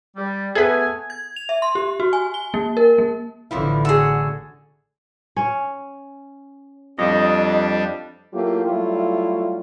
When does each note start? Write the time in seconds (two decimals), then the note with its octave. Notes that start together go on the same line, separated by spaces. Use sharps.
0.16 G3
0.55 A3 B3 G#4 A4 B4 G#5
1.10 G#6
1.36 F7
1.49 E5
1.62 C6
1.75 G4
2.00 F#4
2.13 G#5
2.34 G7
2.54 A#3
2.77 A#4
2.98 A#3
3.51 A1 D3 E3 F3 E4
3.85 F#4 G#4 A4
5.36 C#4 C#5
6.99 F2 G3 D4 C#5 D#5
8.34 F#3 A3 A#3 E4 F4 G4
8.65 F#3 G3 A3 E4 F4